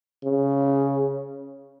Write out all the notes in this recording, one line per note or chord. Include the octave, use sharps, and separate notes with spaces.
C#3